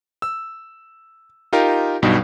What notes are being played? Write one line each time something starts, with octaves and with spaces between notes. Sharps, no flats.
E6
D#4 F4 G4 A#4
B1 G2 B2 G3 D#4